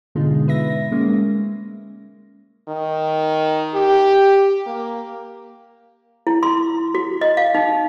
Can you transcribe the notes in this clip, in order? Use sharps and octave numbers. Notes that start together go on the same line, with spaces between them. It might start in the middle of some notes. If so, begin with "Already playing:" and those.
G#2 B2 D3 G#3 D#4 F4
B4 E5 A#6
G#3 A#3 C#4
D#3
G4
A#3
E4
C6
F#4
D#5
F5
D#4